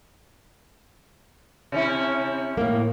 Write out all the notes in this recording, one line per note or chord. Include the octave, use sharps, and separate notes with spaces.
C3 C#4 E4
A2 A#3